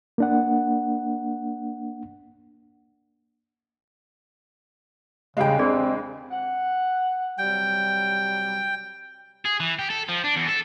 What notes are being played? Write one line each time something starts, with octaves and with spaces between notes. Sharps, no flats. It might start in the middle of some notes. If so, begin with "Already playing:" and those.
A#3 D4 F#5
E2 C#3 G3 G#3 F5 G5
C4 D4 G#4 D5
F#5
C3 F#3 G3 G5
G#4
E3
G4
A4
F3
D4
E2
A4